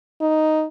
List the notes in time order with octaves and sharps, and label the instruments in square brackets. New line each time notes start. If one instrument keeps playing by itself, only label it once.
[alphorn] D#4